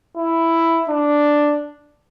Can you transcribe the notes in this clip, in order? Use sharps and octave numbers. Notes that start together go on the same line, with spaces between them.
E4
D4